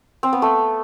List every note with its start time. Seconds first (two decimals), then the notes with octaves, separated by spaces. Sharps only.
0.23 C4
0.33 B3
0.42 A3